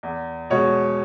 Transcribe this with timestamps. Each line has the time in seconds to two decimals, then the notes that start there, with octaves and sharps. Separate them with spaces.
0.03 E2
0.50 B2 G#3 C#5